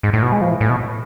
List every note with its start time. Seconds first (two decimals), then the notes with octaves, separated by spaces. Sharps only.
0.03 G#2
0.13 A2
0.22 B2
0.32 G#3
0.41 F3
0.50 E3
0.61 A2
0.70 B2